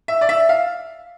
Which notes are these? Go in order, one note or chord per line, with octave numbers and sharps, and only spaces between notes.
E5
D5
E5
F5